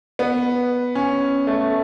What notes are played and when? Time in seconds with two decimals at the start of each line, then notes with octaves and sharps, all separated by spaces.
0.19 B3
0.95 C#4
1.47 A3